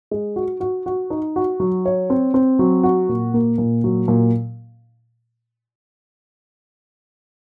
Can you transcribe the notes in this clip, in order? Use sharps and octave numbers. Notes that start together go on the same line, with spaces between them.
G#3
F#4
F#4
F#4
D#4
F#4
F#3
C#5
C4
C4
F#3
F#4
A#2
A#3
A#2
F#3
A#2